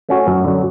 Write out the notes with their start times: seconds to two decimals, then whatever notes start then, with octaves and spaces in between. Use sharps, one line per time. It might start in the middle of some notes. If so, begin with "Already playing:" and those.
0.09 A3 C#4 F#4
0.27 F#2
0.44 D3 F#3